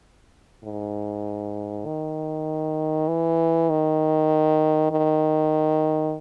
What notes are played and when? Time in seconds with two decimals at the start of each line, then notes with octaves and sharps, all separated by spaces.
0.64 G#2
1.86 D#3
3.08 E3
3.70 D#3
4.91 D#3